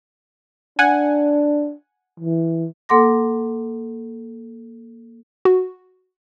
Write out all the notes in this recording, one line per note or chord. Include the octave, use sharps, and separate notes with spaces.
D4 F#5 G#5
E3
A#3 A4 F#5 C6 D6 A#6
F#4